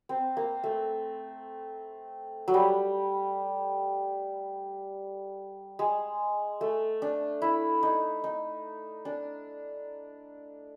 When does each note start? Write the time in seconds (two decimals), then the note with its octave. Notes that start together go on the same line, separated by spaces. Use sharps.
0.09 C4
0.37 A#3
0.63 A3
2.48 F#3
2.54 G3
5.79 G#3
6.61 A3
7.02 D4
7.42 E4
7.83 D#4
8.24 D#4
9.05 D4